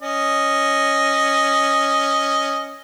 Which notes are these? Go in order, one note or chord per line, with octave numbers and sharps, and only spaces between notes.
C#4 D#5